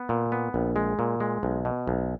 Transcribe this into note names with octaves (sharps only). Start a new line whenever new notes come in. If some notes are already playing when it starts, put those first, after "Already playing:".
Already playing: B3
A#2
B3
A#1
G#3
A#2
G#3
B1
B2
B1